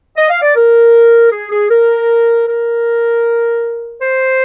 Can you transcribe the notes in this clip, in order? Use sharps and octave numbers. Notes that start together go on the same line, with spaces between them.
D#5
F5
D5
A#4
G#4
G#4
A#4
A#4
C5